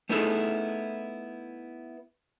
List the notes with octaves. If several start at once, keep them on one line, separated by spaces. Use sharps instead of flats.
A3 B3 D#4 E4 G#4 A4